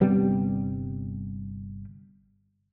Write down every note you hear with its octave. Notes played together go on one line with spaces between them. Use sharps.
G1 C3 G3 B3